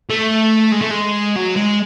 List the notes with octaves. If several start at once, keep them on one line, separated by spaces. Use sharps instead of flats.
A3
G#3
A3
G#3
F#3
G#3